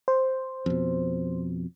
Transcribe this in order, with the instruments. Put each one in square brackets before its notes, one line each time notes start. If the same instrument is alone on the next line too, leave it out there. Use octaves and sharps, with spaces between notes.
[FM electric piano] C5
[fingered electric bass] F2 B2